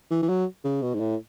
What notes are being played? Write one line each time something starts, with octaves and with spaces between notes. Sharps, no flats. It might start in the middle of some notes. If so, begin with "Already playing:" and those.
E3
E3
F#3
C#3
B2
G#2
A2